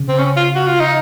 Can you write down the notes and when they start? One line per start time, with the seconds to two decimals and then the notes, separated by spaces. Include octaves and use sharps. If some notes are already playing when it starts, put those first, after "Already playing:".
Already playing: C#3
0.09 C4
0.18 C#4
0.37 F4
0.55 F#4
0.67 F4
0.80 D#4